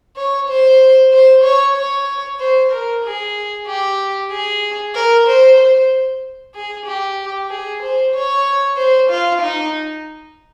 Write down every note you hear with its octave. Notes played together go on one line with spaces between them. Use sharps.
C#5
C5
C5
C#5
C#5
C5
A#4
G#4
G4
G#4
A#4
C5
C5
G#4
G4
G#4
C5
C#5
C5
F4
D#4